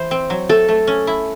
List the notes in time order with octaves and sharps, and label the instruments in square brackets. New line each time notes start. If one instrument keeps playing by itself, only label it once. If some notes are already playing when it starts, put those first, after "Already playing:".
Already playing: [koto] E3 E4 [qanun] C5
[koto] C4
F#3
[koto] A3 [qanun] A4
[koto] A3
C#4
E4